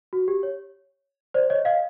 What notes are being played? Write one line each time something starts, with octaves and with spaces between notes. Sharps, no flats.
F#4
G4
C#5
C5 D5
C#5 D#5
D#5 F5